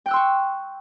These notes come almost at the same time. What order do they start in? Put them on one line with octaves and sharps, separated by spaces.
G5 F#6 E6 C6 C#6